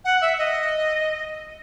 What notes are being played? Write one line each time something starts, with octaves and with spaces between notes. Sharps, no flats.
F#5
E5
D#5